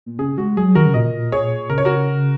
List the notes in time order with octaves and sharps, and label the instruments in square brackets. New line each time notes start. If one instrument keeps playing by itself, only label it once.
[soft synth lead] A#2
[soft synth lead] C#3 [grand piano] G#4
[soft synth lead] G#3 [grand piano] F#4
[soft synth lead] F#3 [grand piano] G#4
[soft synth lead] D#3 [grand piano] F#4 A#4
[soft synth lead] C#3
[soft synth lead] A#2 [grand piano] A#4 D#5
[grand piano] G#4 C#5
[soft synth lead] C#3 [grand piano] A#4
[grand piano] C#5
F#4 A#4